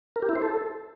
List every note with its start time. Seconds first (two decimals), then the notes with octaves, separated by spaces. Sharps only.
0.16 A#4
0.22 G4
0.29 E4
0.35 C5
0.42 A4